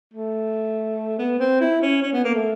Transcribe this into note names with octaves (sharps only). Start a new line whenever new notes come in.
A3
B3
C4
E4
C#4
C#4
B3
A#3
A3